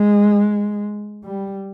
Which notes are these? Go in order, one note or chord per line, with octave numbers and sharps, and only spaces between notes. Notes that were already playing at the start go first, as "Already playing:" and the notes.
Already playing: G#3
G3